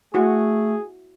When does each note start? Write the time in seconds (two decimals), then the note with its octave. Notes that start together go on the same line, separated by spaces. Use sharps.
0.14 A3 E4 F#4 G#4 C#6